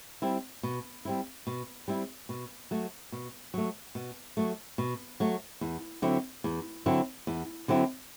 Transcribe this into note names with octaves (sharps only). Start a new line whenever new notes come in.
G3 C4 E4
B2
G3 C4 E4
B2
G3 C4 E4
B2
F#3 A3
B2
F#3 A3
B2
F#3 A3
B2
F#3 A3
E2
D3 F#3 C4 E4
E2
D3 F#3 C4 E4
E2
D3 F#3 C4 E4